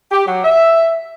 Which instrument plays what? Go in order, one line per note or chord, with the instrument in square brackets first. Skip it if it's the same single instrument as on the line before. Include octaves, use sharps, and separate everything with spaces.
[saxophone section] G4
F#3
E5